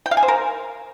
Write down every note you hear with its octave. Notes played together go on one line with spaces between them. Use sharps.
G5
F5
G#5
C5
A#4